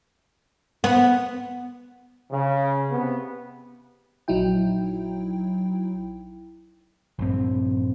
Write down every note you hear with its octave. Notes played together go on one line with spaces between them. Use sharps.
B3
C#3
C3 B3
A#1 F#3 D#4 E4 G5
A#1 G2 C4